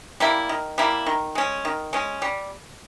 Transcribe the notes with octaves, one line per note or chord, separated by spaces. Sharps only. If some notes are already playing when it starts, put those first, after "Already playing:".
G3 A#3 E4
D#3
G3 A#3 E4
D#3
G#3 C#4
D#3
G#3 C#4
G3